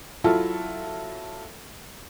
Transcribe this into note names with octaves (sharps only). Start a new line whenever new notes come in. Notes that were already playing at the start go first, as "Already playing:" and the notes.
F#3 E4 F4 A4